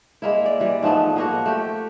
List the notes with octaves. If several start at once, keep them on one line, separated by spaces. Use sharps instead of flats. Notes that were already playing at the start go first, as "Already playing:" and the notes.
G#3 A#3 E4
D5
E3 G3
G#2 F3 A3 B3
F3 A#3 F#4
A3 G4